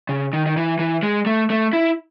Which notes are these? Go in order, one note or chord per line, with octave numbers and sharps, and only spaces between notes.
C#3
D#3
D#3
E3
E3
G#3
A3
A3
E4